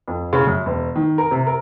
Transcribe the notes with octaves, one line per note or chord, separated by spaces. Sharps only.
F2
C#3
F#2
E1
D#3
A#4
C3
A#4